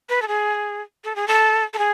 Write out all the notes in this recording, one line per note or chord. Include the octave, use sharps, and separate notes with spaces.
B4
A4
G#4
A4
G#4
A4
A4
G#4